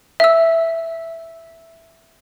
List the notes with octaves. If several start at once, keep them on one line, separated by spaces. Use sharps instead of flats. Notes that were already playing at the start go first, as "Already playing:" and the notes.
E5 E6